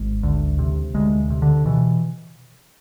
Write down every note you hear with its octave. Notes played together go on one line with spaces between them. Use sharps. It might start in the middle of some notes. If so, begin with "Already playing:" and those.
Already playing: G#1 G#3
D2
C3
D2 G#3
C3
D3
B2 E3